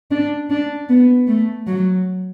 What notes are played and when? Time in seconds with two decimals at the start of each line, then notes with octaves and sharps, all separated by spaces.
0.11 D4
0.50 D4
0.89 B3
1.28 A3
1.67 F#3